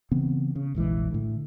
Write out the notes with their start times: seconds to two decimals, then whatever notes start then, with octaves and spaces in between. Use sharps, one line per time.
0.12 C#3 E3 B3 C4
0.56 C#3
0.75 F1 A#1 E3 G#3
1.11 A2 D3